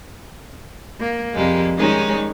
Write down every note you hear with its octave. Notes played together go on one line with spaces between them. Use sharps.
A#3
F2 C3 G3 G#3 A#3
D#3 G3 G#3 C#4 D#4